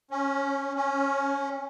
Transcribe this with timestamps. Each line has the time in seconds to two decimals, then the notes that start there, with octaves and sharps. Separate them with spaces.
0.11 C#4
0.76 C#4